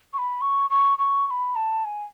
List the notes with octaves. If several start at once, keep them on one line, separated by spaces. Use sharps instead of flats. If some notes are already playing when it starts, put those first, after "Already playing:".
C#6
B5
C#6
C#6
C#6
C#6
B5
A5
G#5